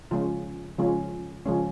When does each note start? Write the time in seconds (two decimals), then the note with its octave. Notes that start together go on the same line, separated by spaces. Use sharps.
0.11 C#3 F3 G#3 C#4 F4
0.79 C#3 F3 G#3 C#4 F4
1.46 C#3 F3 G#3 C#4